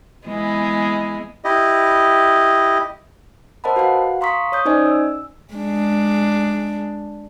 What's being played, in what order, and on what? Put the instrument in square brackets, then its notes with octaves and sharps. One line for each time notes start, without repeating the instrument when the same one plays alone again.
[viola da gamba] E3 G#3 B3
[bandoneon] E4 G4 D#5
[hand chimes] A#4 C5 D#5 F#5 A5 B5
F#4 B4 F5 F#5
F5 A#5 C6 C#6 D#6 B6
C#5 D#6 G6
C#4 D#4 C5 D5 D#5 G#5
E6
[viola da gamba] G#3 D4